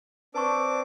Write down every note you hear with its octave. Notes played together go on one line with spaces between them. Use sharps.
C4 D4 B4 A5 C#6 D6